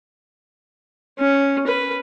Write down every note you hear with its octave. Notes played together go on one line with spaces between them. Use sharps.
C#4
B4